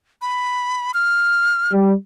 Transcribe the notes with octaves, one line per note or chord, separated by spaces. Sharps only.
B5
F6
G3